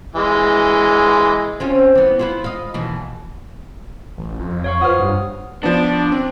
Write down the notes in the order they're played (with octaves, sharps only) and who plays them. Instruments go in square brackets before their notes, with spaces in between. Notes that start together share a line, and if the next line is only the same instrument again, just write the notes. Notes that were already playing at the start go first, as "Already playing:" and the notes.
[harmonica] E3 G#3
[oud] C4 C#4 F4
E3 B3
B3 E4 F4
D#5 F5
D#2 B2 E3
[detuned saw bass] A1
F2
[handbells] C#5 F5 C#6
[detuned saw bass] F4 [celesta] B4 C5 F#5 [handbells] D#6 F6
[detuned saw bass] G2
[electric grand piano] F3 B3 [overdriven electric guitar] D4
[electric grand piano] C4